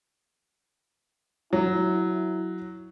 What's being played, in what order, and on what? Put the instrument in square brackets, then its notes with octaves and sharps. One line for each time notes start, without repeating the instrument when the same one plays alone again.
[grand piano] F#3 [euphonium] E4